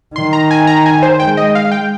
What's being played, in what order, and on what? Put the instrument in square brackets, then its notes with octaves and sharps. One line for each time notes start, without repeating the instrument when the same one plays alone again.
[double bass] D#3 [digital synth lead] C6
[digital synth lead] A#5
G#5
A#5
G#5
C5
[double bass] G#3 [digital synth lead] G5
[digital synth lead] D#5
F5
G5